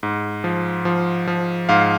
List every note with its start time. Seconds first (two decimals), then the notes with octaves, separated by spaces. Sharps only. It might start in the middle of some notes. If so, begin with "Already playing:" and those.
0.03 G#2
0.44 F3
0.85 F3
1.27 F3
1.69 G#2 F5